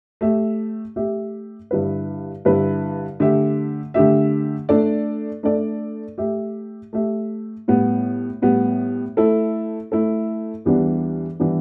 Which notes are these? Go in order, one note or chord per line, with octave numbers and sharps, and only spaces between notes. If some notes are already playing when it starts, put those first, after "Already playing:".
A3 G4 E5
A3 G4 E5
G2 D3 G3 E4 B4
G2 D3 G3 E4 B4
D3 A3 G4 E5
D3 A3 G4 E5
A3 D4 A4 D5
A3 D4 A4 D5
A3 G4 E5
A3 G4 E5
A2 G3 B3
A2 G3 B3
A3 E4 A4
A3 E4 A4
E2 E3 G3 B3 D4
E3 G3 B3 D4